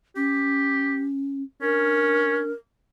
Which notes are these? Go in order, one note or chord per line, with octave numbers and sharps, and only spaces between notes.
C#4 G4
C#4 D4 A#4